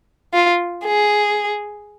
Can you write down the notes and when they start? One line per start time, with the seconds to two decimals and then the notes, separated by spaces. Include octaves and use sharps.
0.33 F4
0.85 G#4